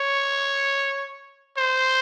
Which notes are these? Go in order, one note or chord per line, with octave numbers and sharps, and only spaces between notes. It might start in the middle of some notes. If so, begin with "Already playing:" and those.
Already playing: C#5
C5